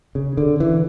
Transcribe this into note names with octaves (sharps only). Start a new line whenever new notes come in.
C#3
D3
E3